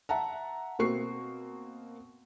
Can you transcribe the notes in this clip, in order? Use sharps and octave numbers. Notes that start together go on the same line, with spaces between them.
E5 F#5 A5 A#5
B2 A#3 C4 C#6 C7